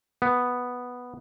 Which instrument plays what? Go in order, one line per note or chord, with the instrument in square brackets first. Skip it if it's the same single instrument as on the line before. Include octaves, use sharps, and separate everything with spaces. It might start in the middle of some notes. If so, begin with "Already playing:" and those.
[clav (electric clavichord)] B3